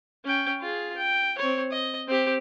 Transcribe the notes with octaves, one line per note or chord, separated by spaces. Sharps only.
C#4 G5
F4 G#4
G5
C4 C#5
D#5
C4 G4